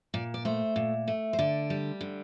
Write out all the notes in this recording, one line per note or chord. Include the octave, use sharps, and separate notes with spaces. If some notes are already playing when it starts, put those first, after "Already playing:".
A#2 D5
D5
A3 C5
A#2
A3
C5
D3 D5
G3
D3